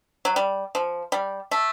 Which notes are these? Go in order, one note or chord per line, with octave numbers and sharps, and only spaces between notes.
F#3
G3
F3
G3
A3